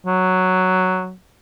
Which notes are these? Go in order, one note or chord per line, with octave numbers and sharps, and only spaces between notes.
F#3